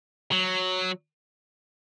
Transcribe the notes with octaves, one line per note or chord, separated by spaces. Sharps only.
F#3